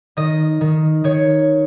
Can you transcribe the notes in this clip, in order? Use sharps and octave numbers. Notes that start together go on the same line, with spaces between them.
D#3 D#5
D#3
D#3 C#5